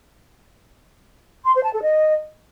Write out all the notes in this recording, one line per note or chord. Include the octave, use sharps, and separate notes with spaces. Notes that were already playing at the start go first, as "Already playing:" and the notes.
C6
C5
A5
A4
D#5